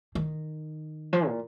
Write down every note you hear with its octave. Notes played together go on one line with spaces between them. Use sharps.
D#3
F3
A#2